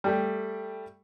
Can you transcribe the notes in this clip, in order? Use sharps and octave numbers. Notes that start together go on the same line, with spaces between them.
G3 A3 G5